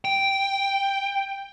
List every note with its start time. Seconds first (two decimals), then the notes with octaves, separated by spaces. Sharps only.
0.05 G5